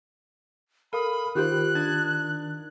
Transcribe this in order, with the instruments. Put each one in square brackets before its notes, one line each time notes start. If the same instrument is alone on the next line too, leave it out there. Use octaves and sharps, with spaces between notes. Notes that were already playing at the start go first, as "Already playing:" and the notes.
[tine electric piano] A4 [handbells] A#4 F5 D#6 [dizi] B5
[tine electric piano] D#3 [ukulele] F4 G4 C5 [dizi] F#6
[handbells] D4 G#6 A6